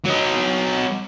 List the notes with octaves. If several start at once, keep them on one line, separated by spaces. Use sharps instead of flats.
F#3 D#5